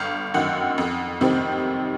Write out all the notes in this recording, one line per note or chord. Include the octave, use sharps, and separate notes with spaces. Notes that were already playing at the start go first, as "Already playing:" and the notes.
Already playing: G1 F5
F#2 D#3 F#5
F2
C3 D#3 G3 C4